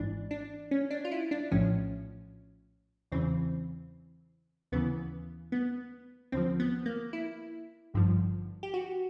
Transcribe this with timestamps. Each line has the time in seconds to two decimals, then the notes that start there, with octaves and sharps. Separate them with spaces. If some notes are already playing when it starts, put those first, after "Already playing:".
Already playing: G#1 G#2 E3 D4
0.31 D4
0.71 C#4
0.91 D4
1.05 F4
1.11 E4
1.31 D4
1.51 A#1 A2 F3 C#4
3.12 E2 C#3 E3 C4
4.72 D#2 C#3 E3 B3
5.52 B3
6.32 D#2 D3 F3 C4
6.60 B3
6.86 A#3
7.13 E4
7.94 G#1 G2 D3 F3
8.63 G4
8.74 F#4